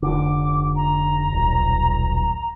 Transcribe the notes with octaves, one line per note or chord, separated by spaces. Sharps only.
F1 D3 D6
A#5
D#1 B1